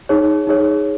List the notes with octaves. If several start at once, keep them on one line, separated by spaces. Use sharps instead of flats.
D#4 G#4 C#5
D#4 G#4 C#5